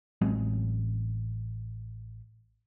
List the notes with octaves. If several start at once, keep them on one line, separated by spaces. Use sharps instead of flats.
A1 F#3 G#3 C4